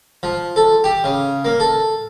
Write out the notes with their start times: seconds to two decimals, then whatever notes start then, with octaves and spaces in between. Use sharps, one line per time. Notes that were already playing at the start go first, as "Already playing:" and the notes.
0.23 F3
0.56 A4
0.84 G4
1.04 C#3
1.45 A#3
1.60 A4